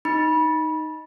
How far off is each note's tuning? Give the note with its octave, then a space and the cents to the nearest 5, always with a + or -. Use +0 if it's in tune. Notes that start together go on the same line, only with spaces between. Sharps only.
D#4 +0 B5 -25